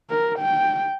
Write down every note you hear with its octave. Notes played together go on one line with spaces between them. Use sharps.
A#4
G5